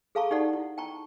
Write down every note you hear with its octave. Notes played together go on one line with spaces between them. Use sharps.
G#4 A4 F5 A5 A#5 C#6
D#4 G4 A4 D5 F#5
E4
G5 A5 A#5 C#6